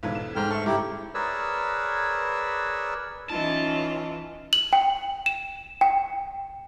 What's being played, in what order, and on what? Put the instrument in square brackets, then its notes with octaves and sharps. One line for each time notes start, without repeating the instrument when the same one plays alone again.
[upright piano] B1 G#2 G#6 [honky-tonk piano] E2 D3 B4
[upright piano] E7
[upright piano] G#2 A3 [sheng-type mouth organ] G5 F6
[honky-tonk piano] A4 E5 [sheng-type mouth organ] C#6
[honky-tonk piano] G2 C#3 [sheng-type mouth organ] E4 G4 [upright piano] A#5
[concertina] G#4 A#4 B4 C#5 D5 E6
[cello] E3 F4 [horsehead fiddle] C#4 D#4 [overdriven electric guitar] A5
[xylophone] F#7
G5
E7
G5